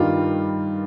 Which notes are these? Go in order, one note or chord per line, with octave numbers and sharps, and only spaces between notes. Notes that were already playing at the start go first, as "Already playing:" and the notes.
Already playing: G2 D#3 G3 F4